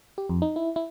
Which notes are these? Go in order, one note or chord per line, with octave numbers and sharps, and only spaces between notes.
G4
F2
D#4
E4
E4